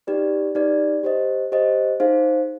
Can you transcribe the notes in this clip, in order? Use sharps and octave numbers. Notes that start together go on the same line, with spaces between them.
D#4 G4 B4 D5
D#4 G4 B4 D5
G4 C5 D#5
G4 C5 D#5
D#4 G#4 C5 F5